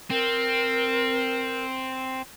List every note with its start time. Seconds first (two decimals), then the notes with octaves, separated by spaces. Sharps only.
0.10 C4 A#4